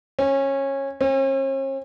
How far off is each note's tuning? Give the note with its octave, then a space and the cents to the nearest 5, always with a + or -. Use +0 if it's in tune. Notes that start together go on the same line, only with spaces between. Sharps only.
C#4 -20
C#4 -45